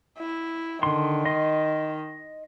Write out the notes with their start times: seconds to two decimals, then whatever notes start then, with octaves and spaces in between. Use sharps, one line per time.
0.18 E4
0.83 D3 D#3 C6
1.25 D#5 C6